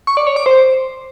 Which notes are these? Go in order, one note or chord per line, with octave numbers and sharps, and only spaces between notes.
C#6
D5
C#5
D6
C5